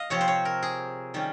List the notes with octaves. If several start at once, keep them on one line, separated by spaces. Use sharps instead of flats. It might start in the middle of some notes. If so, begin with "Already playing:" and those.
Already playing: D#5 F5
C3 F3 C4 C#5
C5
C#5
A#4
G#4
D#3 G3 C#4